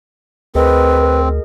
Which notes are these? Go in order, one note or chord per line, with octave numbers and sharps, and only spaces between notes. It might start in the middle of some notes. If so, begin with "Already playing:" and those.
D2 C4 G#4 A#4 B4 D#5